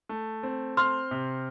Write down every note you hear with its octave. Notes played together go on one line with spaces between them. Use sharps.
A3
C4
C4 C6 F6
C3